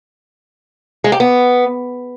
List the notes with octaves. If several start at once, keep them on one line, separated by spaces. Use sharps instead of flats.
G#3
G4
B3